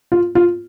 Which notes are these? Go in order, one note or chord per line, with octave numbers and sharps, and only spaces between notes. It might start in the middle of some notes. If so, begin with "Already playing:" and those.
F4
F4